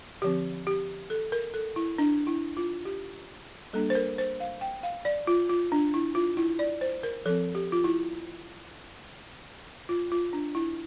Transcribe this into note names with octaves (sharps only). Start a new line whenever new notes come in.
D3 F3 C4 G4
G4
A4
A#4
A4
E4
D4
E4
F4
G4
G3 A#3 D4 A4
C5
A#4
C5
F5
G5
F5
D5
F4
F4
D4
E4
F4
E4
D5
C5
A#4
F3 C4 A4
G4
F4
E4
F4
F4
D4
E4